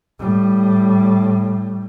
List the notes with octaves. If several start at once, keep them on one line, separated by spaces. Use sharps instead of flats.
A2 G3